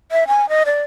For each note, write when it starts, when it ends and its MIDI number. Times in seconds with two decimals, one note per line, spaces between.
0.12 0.27 76
0.28 0.48 80
0.49 0.63 75
0.66 0.82 74